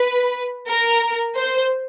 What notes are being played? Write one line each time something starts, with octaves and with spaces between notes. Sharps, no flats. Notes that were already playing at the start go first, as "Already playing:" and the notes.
Already playing: B4
A#4
C5